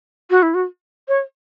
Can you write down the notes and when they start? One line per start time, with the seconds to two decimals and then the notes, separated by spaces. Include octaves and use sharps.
0.30 F#4
0.43 E4
0.54 F#4
1.08 C#5